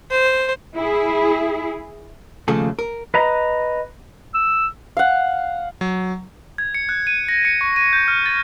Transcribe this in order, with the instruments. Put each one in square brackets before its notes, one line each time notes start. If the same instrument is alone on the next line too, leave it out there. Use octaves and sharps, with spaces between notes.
[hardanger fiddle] C5
[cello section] E4 G#4
[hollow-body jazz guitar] D#2 C#3 F3 A3 G#4 A4
A#4
[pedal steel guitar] B4 D#5 A#5
[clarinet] E6
[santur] F5 F#5
[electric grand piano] F#3
[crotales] G#6
C#7
F#6
D#7
A#6
C#7
C#6
D#7
G6
F6
A6